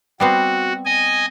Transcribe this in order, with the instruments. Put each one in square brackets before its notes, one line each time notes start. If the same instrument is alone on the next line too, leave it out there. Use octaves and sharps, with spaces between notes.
[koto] G3 B3 C4 [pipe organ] F#4
[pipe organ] D#5 G#5